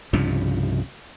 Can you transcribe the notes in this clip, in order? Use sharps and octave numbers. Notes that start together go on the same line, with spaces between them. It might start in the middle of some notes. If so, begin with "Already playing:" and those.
C2 G2 C#3 F3